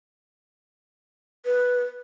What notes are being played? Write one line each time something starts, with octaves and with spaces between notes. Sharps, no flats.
B4